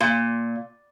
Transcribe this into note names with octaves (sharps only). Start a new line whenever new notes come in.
A#2